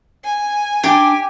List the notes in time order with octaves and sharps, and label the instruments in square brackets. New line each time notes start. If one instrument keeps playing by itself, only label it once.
[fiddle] G#5
[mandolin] D4 [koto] G4